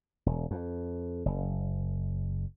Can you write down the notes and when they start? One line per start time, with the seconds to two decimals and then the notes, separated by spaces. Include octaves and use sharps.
0.26 E1
0.51 F2
1.26 F#1